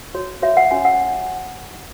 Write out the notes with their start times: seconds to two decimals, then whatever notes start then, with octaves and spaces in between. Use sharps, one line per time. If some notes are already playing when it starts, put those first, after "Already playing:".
0.14 F#4 C#5
0.42 F#4 C#5 E5
0.57 F#5
0.71 C#4 F#4 C#5 G#5
0.85 F#5